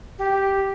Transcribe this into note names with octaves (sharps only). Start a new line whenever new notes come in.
G4